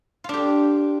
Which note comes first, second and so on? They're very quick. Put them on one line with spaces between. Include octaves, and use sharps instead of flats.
F4 D4 G4